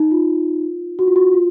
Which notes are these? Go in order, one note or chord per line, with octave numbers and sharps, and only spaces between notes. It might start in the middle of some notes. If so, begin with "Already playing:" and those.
Already playing: D#4
F4
F#4
F4
F#4
F4